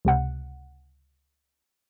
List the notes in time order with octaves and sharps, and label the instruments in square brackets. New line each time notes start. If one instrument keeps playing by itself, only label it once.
[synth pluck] C#2 C3 F#5